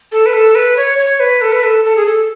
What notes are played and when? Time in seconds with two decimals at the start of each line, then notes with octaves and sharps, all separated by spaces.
0.12 A4
0.26 B4
0.34 A4
0.55 B4
0.77 C#5
0.99 C#5
1.20 B4
1.41 A4
1.52 B4
1.63 A4
1.85 A4
1.96 G#4
2.06 A4